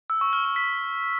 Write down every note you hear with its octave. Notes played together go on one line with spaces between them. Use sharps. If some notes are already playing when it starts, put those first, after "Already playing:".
E6
C#6
F6
C#6
B6